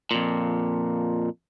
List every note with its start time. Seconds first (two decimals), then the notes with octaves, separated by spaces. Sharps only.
0.11 F2 A#2